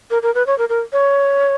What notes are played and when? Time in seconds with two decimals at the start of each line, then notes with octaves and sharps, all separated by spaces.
0.11 A#4
0.23 A#4
0.35 B4
0.47 C#5
0.58 A#4
0.69 A#4
0.93 C#5